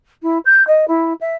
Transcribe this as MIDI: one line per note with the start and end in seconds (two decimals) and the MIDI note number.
0.22 0.38 64
0.45 0.65 91
0.67 0.87 75
0.87 1.13 64
1.20 1.35 76